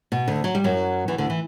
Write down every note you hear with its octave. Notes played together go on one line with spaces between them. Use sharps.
B2
D2 D3
F#3
G3
F#2 F#3
E2 E3
D2 D3
E3